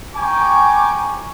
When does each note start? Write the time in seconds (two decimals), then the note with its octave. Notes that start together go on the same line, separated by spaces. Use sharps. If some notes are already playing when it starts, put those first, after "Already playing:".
0.16 G5 G#5 A#5 C#6 D6